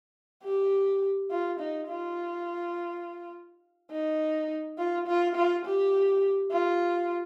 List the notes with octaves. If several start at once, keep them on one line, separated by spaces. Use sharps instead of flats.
G4
F4
D#4
F4
D#4
F4
F4
F4
G4
F4